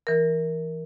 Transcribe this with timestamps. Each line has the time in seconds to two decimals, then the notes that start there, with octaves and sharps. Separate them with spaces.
0.07 E3 A#4